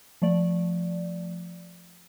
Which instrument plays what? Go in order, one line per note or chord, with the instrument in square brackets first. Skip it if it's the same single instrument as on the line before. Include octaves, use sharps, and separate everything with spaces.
[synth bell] F3 A3 D5